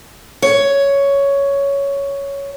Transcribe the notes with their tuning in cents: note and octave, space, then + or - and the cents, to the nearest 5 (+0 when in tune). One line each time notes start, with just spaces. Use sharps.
C#5 +10